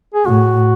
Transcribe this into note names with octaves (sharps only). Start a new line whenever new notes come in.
G#4
A2 F#4